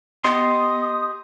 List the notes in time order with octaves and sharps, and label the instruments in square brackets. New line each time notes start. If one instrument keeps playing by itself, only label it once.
[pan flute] B3 [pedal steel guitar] G4 D#5 C6 [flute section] D#6